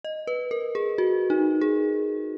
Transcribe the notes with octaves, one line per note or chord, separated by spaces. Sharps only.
D#5
B4
A#4
G#4
F#4
D#4
G#4